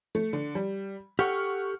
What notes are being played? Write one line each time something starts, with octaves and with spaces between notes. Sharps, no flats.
A3
D3
G3
G4 A4 F#5 C#6 F6